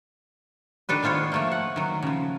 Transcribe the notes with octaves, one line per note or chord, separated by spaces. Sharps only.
D#3 D4 A4 B4
G#3 B3 F4 C5 C#5
F3 A3 A#3
F#5
D#3 F#3
C#3 F3